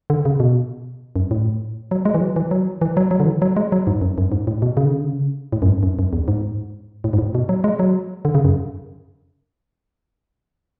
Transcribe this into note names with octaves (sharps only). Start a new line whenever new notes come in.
D3
C#3
B2
F#2
A2
F#3
G#3
E3
F#3
E3
F#3
E3
F#3
F#3
D3
E3
F#3
G#3
F#3
G#2
F#2
F#2
G#2
A2
B2
C#3
D3
C#3
D3
C#3
A2
F#2
G#2
F#2
F#2
E2
G#2
A2
G#2
A2
B2
F#3
G#3
F#3
D3
C#3
F#2